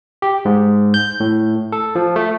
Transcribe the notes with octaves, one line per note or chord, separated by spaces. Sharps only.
G4
G#2
G6
A2
A4
F3
A3